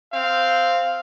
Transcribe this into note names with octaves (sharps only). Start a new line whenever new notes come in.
C4 F5